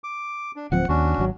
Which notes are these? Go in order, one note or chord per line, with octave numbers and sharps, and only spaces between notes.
D6
D4
D1 F3 C4 F#5
D#2 C#4 D4 F#4
G#1 F#3